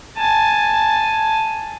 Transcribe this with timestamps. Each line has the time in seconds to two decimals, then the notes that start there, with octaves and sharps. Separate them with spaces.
0.17 G#5 A5